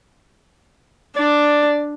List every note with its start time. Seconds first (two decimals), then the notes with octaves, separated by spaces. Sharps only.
1.16 D4 D5